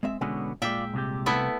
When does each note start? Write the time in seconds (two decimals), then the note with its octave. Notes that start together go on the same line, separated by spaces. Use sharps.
0.03 G#3 C4 E5
0.21 B2 D3 E3 G#3 B3 C#4
0.62 A#2 G#3 F4 D5 E5 G5
0.94 C2 C3 G4
1.26 A3 B3 E4